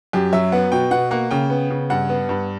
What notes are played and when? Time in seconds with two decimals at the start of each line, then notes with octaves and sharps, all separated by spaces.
0.13 F#2 G4
0.33 F#3 E5
0.52 B3 F#5
0.72 B2 G5
0.91 B2 F#5
1.11 A#3 F#5
1.31 C#3 G5
1.50 B3
1.70 C#3
1.90 G2 F#5
2.09 B3
2.29 G2